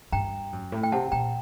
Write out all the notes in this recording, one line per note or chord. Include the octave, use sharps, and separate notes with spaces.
G2 G5 A#5
F#2
A2
G5
C3 F#5 A5
A#2 G5 A#5